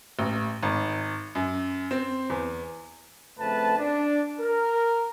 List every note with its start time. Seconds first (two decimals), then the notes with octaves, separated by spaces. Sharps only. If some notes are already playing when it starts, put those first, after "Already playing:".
0.19 A1
0.63 G#1
1.35 F#2
1.91 C4
2.30 E2
3.40 F2 C#3 A3 C4 B4 A5
3.79 D4
4.40 A#4